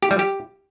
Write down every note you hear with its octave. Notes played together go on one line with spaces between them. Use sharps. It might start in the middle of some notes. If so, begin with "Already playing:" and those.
G4
G3
G4